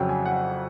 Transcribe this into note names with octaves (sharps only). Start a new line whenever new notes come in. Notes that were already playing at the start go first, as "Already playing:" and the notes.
Already playing: F2 C#3 F#3 G5
G#5
F#5